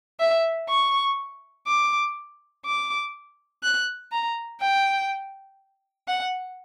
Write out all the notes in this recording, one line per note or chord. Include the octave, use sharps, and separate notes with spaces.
E5
C#6
D6
D6
F#6
A#5
G5
F#5